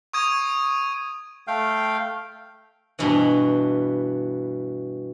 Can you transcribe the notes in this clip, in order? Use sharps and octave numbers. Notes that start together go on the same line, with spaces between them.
C#6 D#6 G#6 D#7
A3 F5 G5
G2 B2 E3